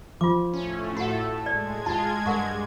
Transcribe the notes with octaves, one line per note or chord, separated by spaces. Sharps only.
F3 F4 D6
A2 A3 C#4
F#4 A4 F#5
G#3 D5 G#6
F4 A5
G2 A#4 F#5 C#6